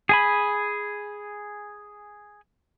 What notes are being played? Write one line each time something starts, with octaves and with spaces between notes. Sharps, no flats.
G#4 G#5 B5